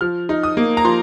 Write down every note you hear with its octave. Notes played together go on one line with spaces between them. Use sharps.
F3 F6
D#4
D#6
A#3
A#5
F3 C6